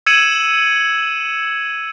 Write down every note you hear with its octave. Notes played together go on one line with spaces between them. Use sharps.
E6 G#6 C#7 D#7 E7 F#7